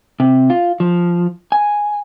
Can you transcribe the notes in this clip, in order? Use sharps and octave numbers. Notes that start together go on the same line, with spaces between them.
C3
F4
F3
G#5